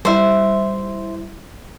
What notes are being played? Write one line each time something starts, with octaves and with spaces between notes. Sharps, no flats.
G3 E4 C5 E5